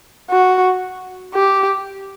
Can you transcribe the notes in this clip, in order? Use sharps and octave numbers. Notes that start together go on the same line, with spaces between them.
F#4
G4